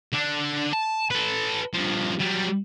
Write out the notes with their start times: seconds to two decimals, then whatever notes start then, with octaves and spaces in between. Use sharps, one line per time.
0.13 D3 D4
0.73 A5
1.11 A4 B4
1.74 G2 F3
2.20 F#3 G3